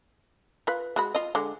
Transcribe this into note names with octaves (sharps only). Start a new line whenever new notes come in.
F4 B4
G#3 F#4 B5
F4 D#5
D3 G#3